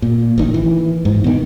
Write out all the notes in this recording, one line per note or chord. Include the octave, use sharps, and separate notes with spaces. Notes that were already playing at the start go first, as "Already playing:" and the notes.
A#2
A1 D#3
E3
G#2
B2 D#3